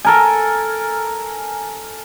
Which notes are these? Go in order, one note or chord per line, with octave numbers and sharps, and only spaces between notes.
A4 A#4 G#5